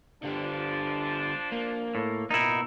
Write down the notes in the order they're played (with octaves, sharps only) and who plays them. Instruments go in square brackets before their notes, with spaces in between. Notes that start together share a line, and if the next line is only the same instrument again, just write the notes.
[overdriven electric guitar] D3 G3 [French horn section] F3 D4
[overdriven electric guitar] A#3
[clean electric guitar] A2
[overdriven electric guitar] B2 A#3 [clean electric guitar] D#4 E4